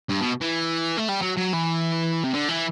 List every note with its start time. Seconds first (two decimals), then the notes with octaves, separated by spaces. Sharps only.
0.09 G2
0.21 B2
0.41 E3
0.97 A3
1.09 G3
1.22 F#3
1.37 F#3
1.54 E3
2.24 C3
2.34 D3
2.48 E3